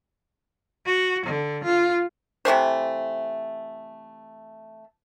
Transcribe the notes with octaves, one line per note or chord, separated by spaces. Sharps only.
F#4
D3
F4
C3 E3 A3 C5